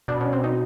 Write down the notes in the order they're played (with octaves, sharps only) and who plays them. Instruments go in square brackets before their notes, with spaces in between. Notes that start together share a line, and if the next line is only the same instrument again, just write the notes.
[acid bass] B2 [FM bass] D4
[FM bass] C#4
C4
D#4